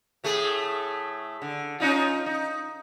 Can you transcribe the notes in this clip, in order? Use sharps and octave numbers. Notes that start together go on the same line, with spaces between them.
A2 A3 G#4
D3
C#4 D#4 F4
D#4